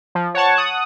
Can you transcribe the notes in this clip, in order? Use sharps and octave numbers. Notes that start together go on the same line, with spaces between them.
F3
C#5 F#5 A5 C#6
F#5 D#6 F#6